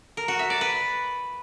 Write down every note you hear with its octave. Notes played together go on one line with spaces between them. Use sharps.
A#4
F#4
E5
D5
B4